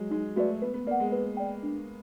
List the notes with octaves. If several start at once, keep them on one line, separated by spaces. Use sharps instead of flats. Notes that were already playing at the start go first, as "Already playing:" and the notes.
Already playing: F#3 G#3
G#3 D#4
A3 F#4 B4 D5
B3 B4
B3
A#3 D5 F#5
G#3
B4
D5 G5
D4